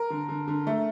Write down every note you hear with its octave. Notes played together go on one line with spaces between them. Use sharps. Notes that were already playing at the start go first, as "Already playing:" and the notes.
Already playing: A#4
D3
D3
D3
A3